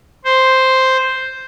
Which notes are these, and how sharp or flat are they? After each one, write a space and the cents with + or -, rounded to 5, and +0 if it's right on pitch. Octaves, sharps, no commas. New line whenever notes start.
C5 +0